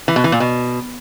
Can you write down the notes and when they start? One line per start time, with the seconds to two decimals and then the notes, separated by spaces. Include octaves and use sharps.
0.08 E3
0.16 B2
0.24 E3
0.32 A#2
0.40 B2